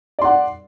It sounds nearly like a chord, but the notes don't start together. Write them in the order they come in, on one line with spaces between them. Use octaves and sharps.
D5 C6 F#5